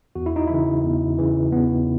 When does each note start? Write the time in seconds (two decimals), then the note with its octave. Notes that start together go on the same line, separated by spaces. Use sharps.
0.15 E2 F#4
0.26 E4
0.36 D#4
0.48 C#3 E3 E4
0.84 E2
1.18 C#3 E3
1.52 E2 B3